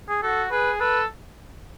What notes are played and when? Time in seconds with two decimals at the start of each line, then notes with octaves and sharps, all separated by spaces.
0.08 G#4
0.23 F#4 A4
0.51 G#4 B4
0.80 A4 B4